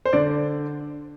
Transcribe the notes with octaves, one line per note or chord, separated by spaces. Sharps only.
C5
D3 D5